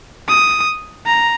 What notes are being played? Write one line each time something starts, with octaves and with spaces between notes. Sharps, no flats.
D#6
A#5